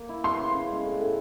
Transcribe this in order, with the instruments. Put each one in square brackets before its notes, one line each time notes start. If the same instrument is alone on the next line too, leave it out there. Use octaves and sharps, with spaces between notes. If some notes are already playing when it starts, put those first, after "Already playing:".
Already playing: [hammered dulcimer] A#3
E4
[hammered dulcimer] B3 [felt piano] C6
[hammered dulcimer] C#3
C#3
G#3
A2
A2